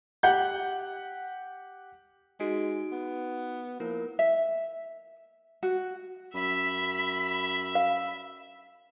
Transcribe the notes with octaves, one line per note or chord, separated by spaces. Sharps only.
G4 F#5 G6
G#3 D#4 F#4 D7
B3
F3 A#3 E4 A#4
E5
F#4
F#2 E5 B5
F5